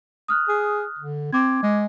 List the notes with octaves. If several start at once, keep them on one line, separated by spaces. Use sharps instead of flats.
D#6 F6 F#6
G#4
D3
C4 D6 G#6
G#3